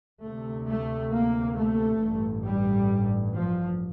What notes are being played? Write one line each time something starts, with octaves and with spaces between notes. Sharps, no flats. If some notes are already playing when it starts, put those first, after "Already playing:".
D2 C3 A3
A3
A#3
A3
A1 G2
G3
F3